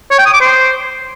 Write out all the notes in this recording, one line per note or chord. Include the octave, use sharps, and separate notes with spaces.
C#5
G5
D#6
D6
C5